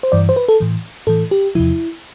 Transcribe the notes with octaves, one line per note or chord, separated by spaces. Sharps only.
C5
G2 E3 D5
C5
B4
A4
A2 E3
A2 E3 A4
G4
E2 C3 F3 E4